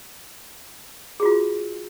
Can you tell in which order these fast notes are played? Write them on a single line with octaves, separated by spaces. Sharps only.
G#4 F#4 F4